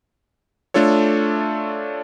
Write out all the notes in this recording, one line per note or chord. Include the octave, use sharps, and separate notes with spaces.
A3 D4 F4 A4 C#5